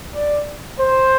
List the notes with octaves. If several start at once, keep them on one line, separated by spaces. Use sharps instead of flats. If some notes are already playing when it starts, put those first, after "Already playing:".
D5
C5